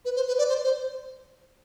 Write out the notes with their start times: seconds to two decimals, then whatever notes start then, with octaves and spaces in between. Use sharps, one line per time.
0.05 B4
0.16 C5
0.28 B4
0.38 D5
0.49 C5
0.64 C5